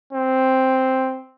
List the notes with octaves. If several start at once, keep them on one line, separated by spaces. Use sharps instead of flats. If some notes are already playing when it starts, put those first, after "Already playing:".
C4